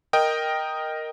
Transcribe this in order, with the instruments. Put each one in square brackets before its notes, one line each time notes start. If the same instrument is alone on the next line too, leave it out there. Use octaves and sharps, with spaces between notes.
[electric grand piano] A#4 D#5 G5